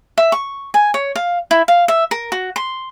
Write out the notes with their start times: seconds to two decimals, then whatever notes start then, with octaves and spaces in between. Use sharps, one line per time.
0.18 E5
0.32 C#6
0.74 G#5
0.94 C#5
1.16 F5
1.51 E4
1.68 F5
1.88 E5
2.11 A#4
2.32 F#4
2.56 C6